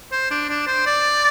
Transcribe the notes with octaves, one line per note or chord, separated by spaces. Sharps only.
C5
D4
D4
C5
D5